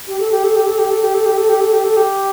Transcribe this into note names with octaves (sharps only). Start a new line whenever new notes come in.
G4
A4
G4
A4
G4
A4
G4
A4
G4
A4
G4
A4
G4
A4
G4
A4
G4